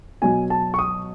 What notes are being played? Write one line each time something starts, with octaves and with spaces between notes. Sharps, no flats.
B2 F#3 G#5
A5
C#6
D#6